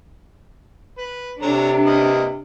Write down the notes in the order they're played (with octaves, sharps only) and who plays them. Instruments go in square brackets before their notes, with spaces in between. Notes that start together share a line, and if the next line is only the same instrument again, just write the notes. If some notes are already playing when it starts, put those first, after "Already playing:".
[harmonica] B4
[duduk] C3 [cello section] D4 [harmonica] A4 C#5 A#5
[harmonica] A#3 B4 D#5